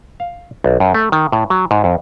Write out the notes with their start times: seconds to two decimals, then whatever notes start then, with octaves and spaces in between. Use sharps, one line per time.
0.20 F5
0.64 B1
0.80 F#2
0.94 A3
1.12 D#3
1.32 A2
1.50 F#3
1.71 G#2
1.84 F2